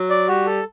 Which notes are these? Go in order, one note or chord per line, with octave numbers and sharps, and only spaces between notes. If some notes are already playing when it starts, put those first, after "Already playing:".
Already playing: F#3
D5
G3 F#4
A4